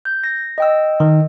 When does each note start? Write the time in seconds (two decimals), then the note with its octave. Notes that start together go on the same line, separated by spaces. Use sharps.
0.05 G6
0.24 A#6
0.58 D#5 G5 E6
1.00 D#3